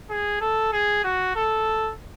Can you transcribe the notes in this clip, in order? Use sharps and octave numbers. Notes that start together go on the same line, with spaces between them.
G#4
A4
G#4
F#4
A4